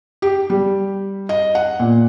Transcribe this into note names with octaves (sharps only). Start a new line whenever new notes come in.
G4
G3
D#5
F#5
A#2